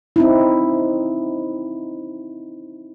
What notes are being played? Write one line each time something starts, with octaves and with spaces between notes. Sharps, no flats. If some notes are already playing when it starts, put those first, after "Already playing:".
C4 D#4 E4